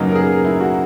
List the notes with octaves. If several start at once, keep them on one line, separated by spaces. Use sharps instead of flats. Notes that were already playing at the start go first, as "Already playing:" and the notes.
Already playing: F#2 C#3 F#3 A#3 D#4 B4
A#4
G#4
E4
F#4